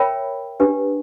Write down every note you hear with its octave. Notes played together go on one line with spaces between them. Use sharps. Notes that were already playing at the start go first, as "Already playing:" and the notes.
Already playing: A#4 C#5 E5 G5 B5
D4 G4 B4